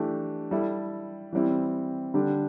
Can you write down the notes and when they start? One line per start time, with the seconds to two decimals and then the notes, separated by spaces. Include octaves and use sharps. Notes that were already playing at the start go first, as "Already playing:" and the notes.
Already playing: E3 A3 D4 G4
0.51 G3 E4 A4
1.33 E3 G3 C4 E4
2.14 D3 G3 D4 G4